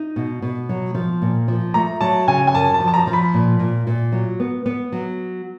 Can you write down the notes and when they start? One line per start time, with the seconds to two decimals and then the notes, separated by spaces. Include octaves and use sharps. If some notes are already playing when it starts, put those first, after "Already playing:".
Already playing: D#4
0.16 B2
0.42 B2
0.69 F#3
0.95 F3
1.22 A#2
1.48 F3
1.74 A3 A#5
2.01 F#3 A5
2.28 C#3 G#5
2.47 G#5
2.54 F#2 A5
2.74 A5
2.80 F3
2.88 A5
2.94 A#5
3.07 F3
3.13 B5
3.34 A#2
3.59 A#2
3.87 A#2
4.12 F#3
4.40 B3
4.66 B3
4.92 F#3